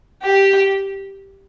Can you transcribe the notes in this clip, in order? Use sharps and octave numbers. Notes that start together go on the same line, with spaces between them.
G4